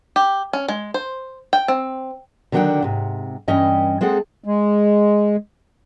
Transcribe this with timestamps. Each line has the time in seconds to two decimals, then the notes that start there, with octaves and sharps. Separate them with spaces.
0.16 G4
0.53 C#4
0.68 G#3
0.94 C5
1.53 G5
1.68 C4
2.52 D3 D#3 F#3 D4 F#5 G5
2.82 G#2 C3
3.48 G2 E3 C#4 D#5 G5
4.01 G#3 C4 G#4 A4 F#5
4.44 G#3